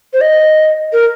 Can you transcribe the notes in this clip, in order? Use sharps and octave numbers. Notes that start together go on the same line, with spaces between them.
C5
D#5
A#4